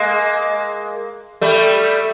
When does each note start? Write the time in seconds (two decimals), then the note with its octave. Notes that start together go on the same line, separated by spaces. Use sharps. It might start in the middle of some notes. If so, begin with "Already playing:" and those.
Already playing: G#3 A#3
1.41 G3 A3